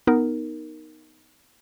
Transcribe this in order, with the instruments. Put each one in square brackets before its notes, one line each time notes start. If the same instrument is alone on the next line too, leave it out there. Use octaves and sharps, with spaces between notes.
[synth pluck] B3 D#4 A#4